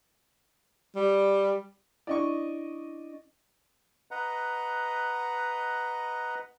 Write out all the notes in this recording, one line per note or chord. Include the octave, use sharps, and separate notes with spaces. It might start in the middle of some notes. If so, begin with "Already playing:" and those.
G3
C#4 D4 E4 D5 D#5 C#6
B4 D#5 F#5 A#5